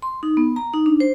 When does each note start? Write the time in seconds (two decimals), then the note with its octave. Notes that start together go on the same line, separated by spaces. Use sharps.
0.02 C6
0.23 D#4
0.37 B3
0.56 A#5
0.74 D#4
0.86 D4
1.00 C5